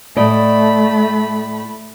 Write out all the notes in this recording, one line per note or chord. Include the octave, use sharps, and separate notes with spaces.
A2 A3 D5 D#5 B5